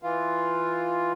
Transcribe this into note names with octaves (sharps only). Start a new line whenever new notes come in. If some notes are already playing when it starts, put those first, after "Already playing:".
E3 F4